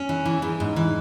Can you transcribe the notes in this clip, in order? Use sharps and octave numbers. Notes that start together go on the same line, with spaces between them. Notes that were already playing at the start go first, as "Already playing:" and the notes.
Already playing: C#4
E3
E3
G#2 E3
G#2
E3